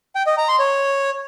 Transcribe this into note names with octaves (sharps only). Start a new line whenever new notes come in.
G5
D#5
A#5
C6
C#5